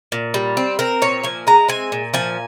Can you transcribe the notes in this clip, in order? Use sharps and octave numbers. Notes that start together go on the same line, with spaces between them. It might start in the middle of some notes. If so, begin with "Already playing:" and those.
A#2
G3
C4
C4 A#4
A#2 C#5
F3 G#5
G#3 A#5
C4 G#5
A#2
F3 G#5